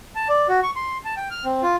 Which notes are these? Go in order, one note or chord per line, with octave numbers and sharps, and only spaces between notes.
A5
D5
F#4
C#6
C6
A5
G5
F6
C4
F4